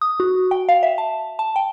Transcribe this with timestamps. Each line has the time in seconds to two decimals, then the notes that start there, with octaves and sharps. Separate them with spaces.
0.01 D#6
0.20 F#4
0.51 G5
0.69 F5
0.83 E5
0.98 A5
1.39 A5
1.56 G5